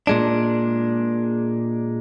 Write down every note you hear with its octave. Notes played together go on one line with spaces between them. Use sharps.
A#2 G#3 D4